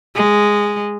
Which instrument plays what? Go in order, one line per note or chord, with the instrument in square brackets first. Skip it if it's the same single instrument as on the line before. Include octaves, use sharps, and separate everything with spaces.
[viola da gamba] G#3